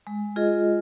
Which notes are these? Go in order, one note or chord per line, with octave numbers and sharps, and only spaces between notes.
G#3
F4 G#4 D#5